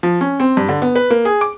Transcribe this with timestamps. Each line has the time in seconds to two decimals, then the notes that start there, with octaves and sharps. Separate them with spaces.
0.03 F3
0.21 C#4
0.40 C4
0.57 G2
0.69 D3
0.82 B3
0.96 B4
1.10 A#3
1.25 G#4
1.41 D6